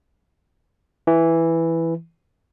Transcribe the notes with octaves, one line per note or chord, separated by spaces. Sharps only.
E3